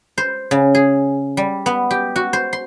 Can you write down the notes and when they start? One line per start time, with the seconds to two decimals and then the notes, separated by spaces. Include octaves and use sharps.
0.18 C5
0.51 C#3
0.75 G#4
1.37 G3
1.66 B3
1.91 G4
2.16 F#4
2.33 C5
2.53 C6